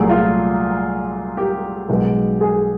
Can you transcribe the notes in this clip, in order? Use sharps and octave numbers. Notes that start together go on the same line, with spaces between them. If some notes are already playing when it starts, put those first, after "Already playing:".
Already playing: C2 A#2 F#3 A3 G#4
F4
G4
B1 B2 G#3
G#4